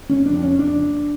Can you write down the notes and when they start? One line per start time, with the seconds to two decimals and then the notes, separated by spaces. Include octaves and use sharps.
0.09 F#1 C#4
0.25 F2 D4
0.42 F#1 C#4
0.59 F2 D4
0.75 F#1